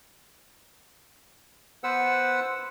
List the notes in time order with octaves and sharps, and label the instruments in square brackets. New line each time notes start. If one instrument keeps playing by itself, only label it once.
[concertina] B3 B4 C5 F#5 E6